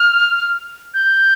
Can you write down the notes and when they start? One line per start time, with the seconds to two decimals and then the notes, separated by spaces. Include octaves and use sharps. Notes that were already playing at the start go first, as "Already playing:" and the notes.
Already playing: F6
0.94 G6